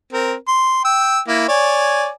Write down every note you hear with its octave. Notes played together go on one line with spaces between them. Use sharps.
C4 A#4
C6
G5 E6
A#3 E4
C#5 D5 G#5